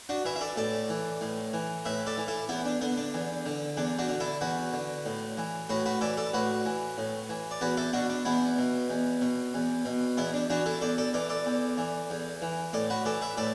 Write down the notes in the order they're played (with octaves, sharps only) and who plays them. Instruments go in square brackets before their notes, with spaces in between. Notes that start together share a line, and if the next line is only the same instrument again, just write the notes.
[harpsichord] D4 F#4
E3 B4 E5
E5
A4 D5
A2 A4 D5
E3
A2
E3
A2 B4 E5
A4 D5
E3
E4 A4
E2 B3 E4
D4
D3 B3
D4
E2
D3
E2 D4
D4 F#4
D3
E4 A4
E2 F#4 B4
D3
A2
E3
A2 F#4 B4
F#4 B4
E3 A4 D5
A4 D5
A2 F#4 B4
E3
A2
E3
D5
E2 F#4 B4
E4 A4
B2 D4 F#4
D4
E2 B3 E4
B2
E2
B2
E2
B2
E2 B3 E4
D4
E3 D4 F#4
E4 A4
E2 A4 D5
A4 D5
E3 A4 D5
A4 D5
E2
E3
E2
E3
A2 A4 D5
F#4 B4
E3 A4 D5
B4 E5
A2 A4 D5